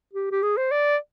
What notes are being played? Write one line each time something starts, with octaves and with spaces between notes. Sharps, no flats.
G4
G4
G#4
C5
D5